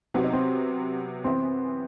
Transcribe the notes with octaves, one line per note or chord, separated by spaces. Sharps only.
C3 F#3 B3 C4 F#4
D#4
C4
F#2 E3 B3 C4 E4